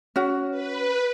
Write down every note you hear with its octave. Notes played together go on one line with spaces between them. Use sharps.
C#4 F#4
B4